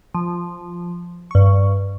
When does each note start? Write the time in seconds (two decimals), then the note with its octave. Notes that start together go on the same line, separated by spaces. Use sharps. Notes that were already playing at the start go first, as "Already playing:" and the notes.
0.15 F3
1.31 G2 C#6